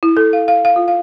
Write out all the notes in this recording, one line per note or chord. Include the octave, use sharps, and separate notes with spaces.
E4
A4
F5
F5
F5
F4
F5